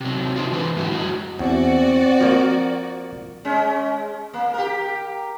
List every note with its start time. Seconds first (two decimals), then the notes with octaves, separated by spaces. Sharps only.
0.01 C3 F#3
0.36 D4 D#4 F4 F#4 C5 D5
0.52 D3 E3 G#3 F#4 A4 B4
0.77 G#2 D3 F#3 E4 F#4 G4
0.91 F#2 F#3 G#3 F#4
1.39 E2 C4 F#4 D5
2.21 F3 A#3
3.45 G#3 C#4
4.33 A#3
4.54 G4 A#4